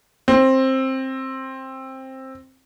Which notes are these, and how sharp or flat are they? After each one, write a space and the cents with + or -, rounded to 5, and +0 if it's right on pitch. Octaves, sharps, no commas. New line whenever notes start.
C4 +15